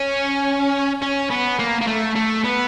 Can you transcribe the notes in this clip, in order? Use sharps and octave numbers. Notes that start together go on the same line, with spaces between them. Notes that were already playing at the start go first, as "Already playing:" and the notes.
Already playing: C#4
C#4
B3
A#3
A#3
A3
A3
B3